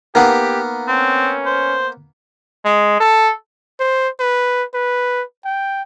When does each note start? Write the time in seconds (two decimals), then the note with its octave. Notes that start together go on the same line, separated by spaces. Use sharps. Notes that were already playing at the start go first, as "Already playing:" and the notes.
0.15 A#3 B3 D#4 G4 A#4 F#5
0.88 C4 C#4
1.46 C5
2.65 G#3
3.00 A4
3.80 C5
4.20 B4
4.74 B4
5.45 G5